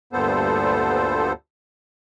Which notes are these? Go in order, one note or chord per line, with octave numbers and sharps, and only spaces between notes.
D2 G2 A#2 B3 A4 C5